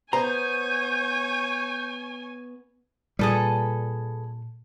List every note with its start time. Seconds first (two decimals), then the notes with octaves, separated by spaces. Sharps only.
0.13 B3 C5 C#5 G#5 A#5 G6
3.19 A#2 G3 G#4 A4 B4